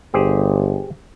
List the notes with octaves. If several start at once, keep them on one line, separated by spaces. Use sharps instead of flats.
G1 G4 G#4 C5